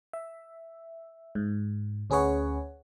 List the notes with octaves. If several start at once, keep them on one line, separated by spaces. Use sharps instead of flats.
E5
G#2
D2 C#4 G#4 B4 C#5 F#5